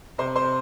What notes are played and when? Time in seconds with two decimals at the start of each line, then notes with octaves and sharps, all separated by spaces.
0.18 C3 C5 C6
0.36 C5 C6